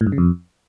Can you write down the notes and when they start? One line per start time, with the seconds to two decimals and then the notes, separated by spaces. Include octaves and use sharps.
0.01 A2
0.07 G2
0.12 C#3
0.18 F2